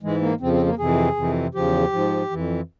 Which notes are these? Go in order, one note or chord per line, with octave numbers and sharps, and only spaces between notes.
G#2 E3 G#3
A#3
F2 C#3 F3 C4
C4
A#3
F2 C3 E3 G#4
F2 C3 E3
E2 C#3 F3 G4
G#2 F3
F2 E3